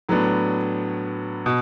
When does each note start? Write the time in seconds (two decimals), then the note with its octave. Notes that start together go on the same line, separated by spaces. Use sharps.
0.09 A2 F#3 B3 D4
1.46 B2